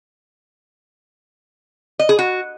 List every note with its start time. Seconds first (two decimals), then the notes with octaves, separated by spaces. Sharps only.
1.99 D#5
2.09 G#4
2.19 F#4